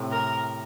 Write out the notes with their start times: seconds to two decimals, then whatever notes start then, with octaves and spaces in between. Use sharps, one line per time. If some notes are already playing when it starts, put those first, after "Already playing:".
Already playing: A2 C3
0.12 A#4